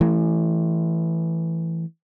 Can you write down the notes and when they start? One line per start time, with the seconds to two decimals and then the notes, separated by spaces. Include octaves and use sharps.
0.01 E3 A3